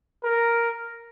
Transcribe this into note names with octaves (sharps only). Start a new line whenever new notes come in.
A#4